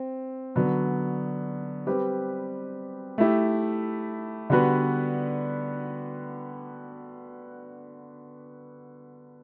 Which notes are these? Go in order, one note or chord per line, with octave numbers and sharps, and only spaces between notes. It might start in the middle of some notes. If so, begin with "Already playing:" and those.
Already playing: C4
D3 F#3 B3 F#4
G3 C4 G4 B4
A3 E4 G4
D3 G3 B3 F#4 B4